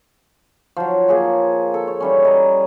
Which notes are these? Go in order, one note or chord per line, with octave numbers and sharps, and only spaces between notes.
F3 F#3
A#3 G#4 C#5
A4
C#5
E3 G3 C#4
D#5 A#5